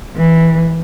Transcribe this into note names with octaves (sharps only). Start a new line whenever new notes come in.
E3